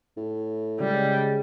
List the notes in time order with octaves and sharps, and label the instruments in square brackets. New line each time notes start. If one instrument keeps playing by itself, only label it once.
[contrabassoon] A2
[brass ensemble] C#3 G#3 [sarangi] G3